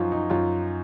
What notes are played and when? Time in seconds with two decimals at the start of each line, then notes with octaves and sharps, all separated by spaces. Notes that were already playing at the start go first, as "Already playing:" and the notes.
Already playing: F#2 F3 D#4 F4
0.12 D#4
0.30 F#2 F4